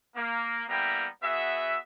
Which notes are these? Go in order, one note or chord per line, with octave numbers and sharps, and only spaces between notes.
A#3
G3 A#3 B3 E4 G5 A#5
B3 F#4 G#4 E5